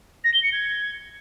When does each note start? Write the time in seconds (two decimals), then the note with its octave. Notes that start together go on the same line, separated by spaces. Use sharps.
0.24 A#6
0.34 G7
0.43 C#7
0.53 G#6